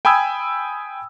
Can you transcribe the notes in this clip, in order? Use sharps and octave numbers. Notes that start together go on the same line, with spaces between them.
G5 G#5 B5 D#6 E6 G#6